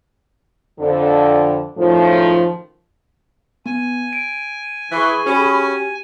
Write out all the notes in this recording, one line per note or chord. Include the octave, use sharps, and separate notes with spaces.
F2 D3
F#2 A2 D#3 F3
B3 G#5
D7
E3 G#4 B5 C#6
C#4 F#4 G4